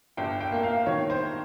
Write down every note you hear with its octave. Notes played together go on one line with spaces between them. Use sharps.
G1 G5
G5
A#3
F5
D#3 C#5
C5